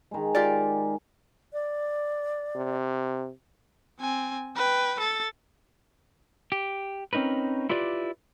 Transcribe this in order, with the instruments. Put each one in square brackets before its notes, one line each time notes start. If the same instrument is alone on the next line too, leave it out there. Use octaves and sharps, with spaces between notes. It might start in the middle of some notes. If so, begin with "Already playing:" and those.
[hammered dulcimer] D#3 G#3
[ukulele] F4 G4 D5
[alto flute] D5
[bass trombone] C3
[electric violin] C4 G#5
B4 G5
A4 A6
[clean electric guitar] G4
C4 C#4 D#4 A#4 B4
E4 F4 G4 B4 D5